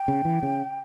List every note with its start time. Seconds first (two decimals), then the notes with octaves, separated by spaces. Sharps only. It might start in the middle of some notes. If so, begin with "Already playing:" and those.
Already playing: G5
0.08 C#3
0.25 E3
0.43 C#3